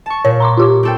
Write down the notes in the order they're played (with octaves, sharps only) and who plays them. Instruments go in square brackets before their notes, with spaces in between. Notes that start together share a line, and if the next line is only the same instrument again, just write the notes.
[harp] A5 C#6
[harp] A#2 [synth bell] C#5
[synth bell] A#5 C6 D6
F4 G4 D6
[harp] C4 A4 G5